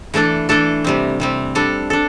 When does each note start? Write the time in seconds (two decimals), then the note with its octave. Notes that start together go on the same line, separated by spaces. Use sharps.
0.14 E3 A3 D4 A4
0.49 E3 A3 D4 A4
0.84 C3 G3 C4
1.20 C3 G3 C4
1.55 G3 D4 A4
1.90 D4 A4